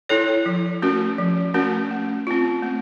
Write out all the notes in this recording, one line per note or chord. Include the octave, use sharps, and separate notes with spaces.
E4 A4 C#5
F3
A3 C#4 F#4 A#4
F3
A3 C#4 F#4 A#4
A3
C4 F4
A3